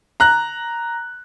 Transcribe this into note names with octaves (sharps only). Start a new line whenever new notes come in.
A#5 F#6